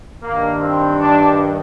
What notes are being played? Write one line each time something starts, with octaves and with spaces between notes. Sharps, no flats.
G2 D#3 A#3
C4
D4